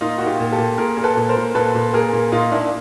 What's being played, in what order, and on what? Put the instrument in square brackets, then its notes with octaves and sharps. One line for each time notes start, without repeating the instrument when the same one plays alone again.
[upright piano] A#2 D#4 F4
A#2 F#4
F4 G4
A#2
G4 A4
A#2
A#2 G#4 A#4
A#2
A4 B4
A#2
A#4 C5
A#2
A#2 A4 B4
A#2
A#2 G#4 A#4
A#2
A#2 D#4 F4
A#2 D4 E4